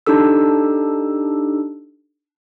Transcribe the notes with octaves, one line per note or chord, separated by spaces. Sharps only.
D4 D#4 G4 A4 E6